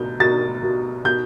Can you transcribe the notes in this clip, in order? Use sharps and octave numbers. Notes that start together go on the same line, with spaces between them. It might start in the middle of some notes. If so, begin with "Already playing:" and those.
Already playing: B2 G6
B2 A6
B2
B2 G6